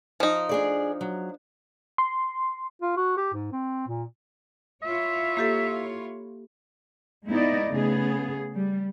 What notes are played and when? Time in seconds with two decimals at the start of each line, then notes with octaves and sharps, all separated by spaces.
0.20 F3 D#4
0.49 D4 G#4 D5
1.01 F#3
1.98 C6
2.82 F4
2.97 F#4
3.17 G4
3.34 G#2
3.53 C4
3.88 A#2
4.83 E4 F4 C#5 E5
5.37 A#3 G4 A4
7.27 G#3 B3 D#4 E4 D5 D#5
7.69 C#3 A3 B3 G#4
8.55 G3